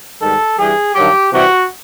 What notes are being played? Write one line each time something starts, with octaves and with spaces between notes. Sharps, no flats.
G#2 D#3 G3 A4
G2 E3 G3 G#4
G2 D#3 F#3 G4
C3 E3 G3 F#4